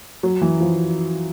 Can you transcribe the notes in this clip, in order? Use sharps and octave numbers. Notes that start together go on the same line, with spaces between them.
F#3
E3
F3